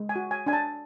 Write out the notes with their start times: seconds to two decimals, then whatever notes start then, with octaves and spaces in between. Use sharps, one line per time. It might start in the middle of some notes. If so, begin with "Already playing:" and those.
Already playing: G#3
0.09 G#5
0.16 F#4
0.31 G#5
0.46 D4 G#5
0.53 A5